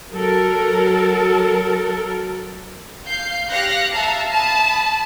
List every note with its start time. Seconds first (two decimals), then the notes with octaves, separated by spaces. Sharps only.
0.12 F#3 A4 A#4
3.05 F5 G6 C7
3.50 G4 F5 F#6 A#6 C#7
3.93 E5 F5 A5 A#5
4.31 A5 B5 D#6